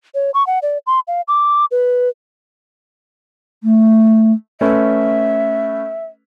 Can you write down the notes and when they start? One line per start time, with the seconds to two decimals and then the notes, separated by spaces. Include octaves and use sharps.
0.15 C#5
0.34 C#6
0.47 F#5
0.62 D5
0.87 C6
1.08 F5
1.28 D6
1.71 B4
3.63 A3
4.61 A3 C#4 B4 E5